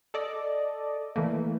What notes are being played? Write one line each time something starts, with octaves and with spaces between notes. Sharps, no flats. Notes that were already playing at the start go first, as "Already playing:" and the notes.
A4 D5 D#5
E3 A3 A#3